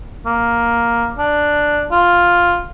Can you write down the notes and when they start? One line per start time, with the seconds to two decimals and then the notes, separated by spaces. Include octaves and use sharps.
0.26 A#3
1.18 D4
1.91 F4